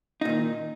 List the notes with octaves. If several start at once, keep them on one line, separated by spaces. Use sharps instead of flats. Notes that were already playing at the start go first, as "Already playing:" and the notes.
A#2 D#3 D#4